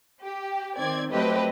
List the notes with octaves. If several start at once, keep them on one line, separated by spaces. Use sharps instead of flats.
G4
D#3 C4 D5 G#6
F#3 A3 C4 G4 B4 D#5